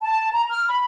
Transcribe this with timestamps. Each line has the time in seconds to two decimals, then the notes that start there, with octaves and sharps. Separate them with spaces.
0.02 A5
0.31 A#5
0.50 F6
0.68 B5